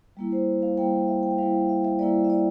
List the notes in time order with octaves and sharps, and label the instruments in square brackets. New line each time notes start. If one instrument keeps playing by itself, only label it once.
[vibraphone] G3 A#3 E4
C5
F5
G3 A#3 E4 G5
F5
E5
G5
G3 A#3 E4 F5
F5
E5
E5
G3 A#3 E4 D5
E5
D5